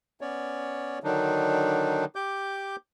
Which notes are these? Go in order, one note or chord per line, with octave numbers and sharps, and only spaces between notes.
B3 C#4 C#5 D5
D3 D#3 F#3 D4 D#4
G4 D6 G6